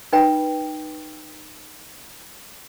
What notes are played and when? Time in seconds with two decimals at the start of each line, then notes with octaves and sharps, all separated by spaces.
0.13 D#4 B4 G5 B5